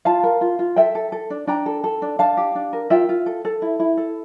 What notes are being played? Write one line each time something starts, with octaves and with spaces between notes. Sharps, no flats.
F4 F5 A5
A#4
F4
F4
A4 E5 G5
A4
A4
D4
D4 G5 A#5
A4
A4
D4
D4 F5 A5
G4
D4
A#4
F4 E5 G5
F4
A4
A4
E4
E4
A4